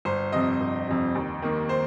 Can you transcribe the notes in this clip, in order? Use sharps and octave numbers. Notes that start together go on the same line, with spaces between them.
G1 C5
F2 C3 D#5
G1
F2 C3
D#2
D#3 A#3
C5